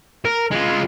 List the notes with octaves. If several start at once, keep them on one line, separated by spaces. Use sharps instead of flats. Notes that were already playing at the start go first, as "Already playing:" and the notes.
A#4
G#3 F4